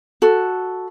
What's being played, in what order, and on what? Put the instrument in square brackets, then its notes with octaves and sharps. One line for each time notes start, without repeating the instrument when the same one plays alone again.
[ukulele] F#4 A4